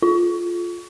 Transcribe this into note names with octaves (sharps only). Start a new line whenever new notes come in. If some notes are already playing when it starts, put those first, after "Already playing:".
F4